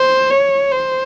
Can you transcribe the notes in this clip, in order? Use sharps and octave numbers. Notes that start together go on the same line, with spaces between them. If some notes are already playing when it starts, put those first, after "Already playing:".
Already playing: C5
C#5
C5